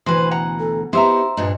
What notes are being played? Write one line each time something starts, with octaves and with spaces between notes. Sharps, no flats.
D2 B2 E3 B4 C5
F#5 A#5
A4
B3 D#4 E4 G4 C5 E5 A#5
G2 A#2 D4 D#5